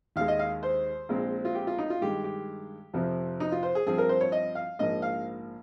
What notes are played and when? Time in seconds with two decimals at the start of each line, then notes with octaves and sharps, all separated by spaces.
0.16 D#2 D#3 G#3 F5
0.28 D#5
0.39 F5
0.63 C5
1.09 A#1 A#2 G#3 C4
1.45 F4
1.55 G4
1.67 F4
1.78 D#4
1.90 F4
2.01 G2 D#3 G#3 G4
2.24 G4
2.94 F2 C3 F3
3.40 D#4
3.52 F4
3.63 C5
3.75 G#4
3.86 G2 F3 C4 G#4
3.98 A#4
4.09 C5
4.21 C#5
4.32 D#5
4.55 F5
4.79 A#1 G#2 F3 A#3 D#5
5.02 F5